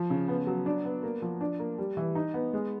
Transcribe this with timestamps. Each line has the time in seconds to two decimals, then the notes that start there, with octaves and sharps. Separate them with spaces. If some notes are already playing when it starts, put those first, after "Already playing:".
Already playing: F3
0.10 C#3
0.28 B3
0.47 F#3
0.66 D4
0.85 B3
1.03 A#3
1.22 F3
1.41 D4
1.59 A#3
1.78 G3
1.97 E3
2.15 D#4
2.34 B3
2.53 G#3